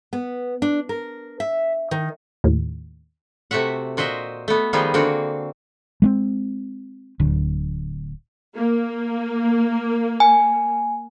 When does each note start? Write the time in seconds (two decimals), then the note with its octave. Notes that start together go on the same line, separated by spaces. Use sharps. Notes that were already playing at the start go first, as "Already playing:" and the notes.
0.13 B3
0.62 D4
0.89 A#4
1.40 E5
1.91 D#3
2.44 D#2 A2
3.51 C3 A3 F#4 E5 F#5
3.97 A#2 F#4 C5 D#5 E5
4.48 A3 B3
4.73 D#3 F3 G3 B3 D#4 G#4
4.94 D3 A#3 C4 F#4
6.02 G#3 A#3 C4
7.20 D1 D2
8.56 A#3
10.20 G#5